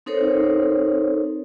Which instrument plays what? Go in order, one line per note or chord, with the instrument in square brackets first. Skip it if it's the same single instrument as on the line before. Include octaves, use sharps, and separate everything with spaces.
[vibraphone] C4 D#4 A4 A#4 C5 C#5